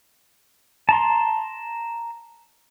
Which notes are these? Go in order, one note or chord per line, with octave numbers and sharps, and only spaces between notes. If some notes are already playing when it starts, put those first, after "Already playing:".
A5 A#5 C6